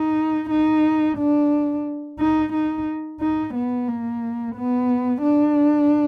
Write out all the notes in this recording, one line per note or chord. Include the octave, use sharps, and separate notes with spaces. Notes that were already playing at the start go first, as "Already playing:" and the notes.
Already playing: D#4
D#4
D4
D#4
D#4
D#4
B3
A#3
B3
D4